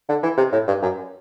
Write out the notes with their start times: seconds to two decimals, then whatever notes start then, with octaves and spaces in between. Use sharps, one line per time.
0.09 D3
0.23 E3
0.37 C3
0.52 A2
0.67 G2
0.82 F#2